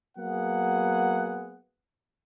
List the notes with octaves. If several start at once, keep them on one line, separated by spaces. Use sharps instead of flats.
F#3 A#3 B3 G#4 F#5